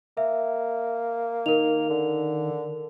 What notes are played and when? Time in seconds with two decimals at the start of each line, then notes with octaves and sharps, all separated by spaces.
0.17 A#3 E5
1.46 D#3 A#4 F7
1.90 D3